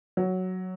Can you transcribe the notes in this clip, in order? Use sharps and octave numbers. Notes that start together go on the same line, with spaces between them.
F#3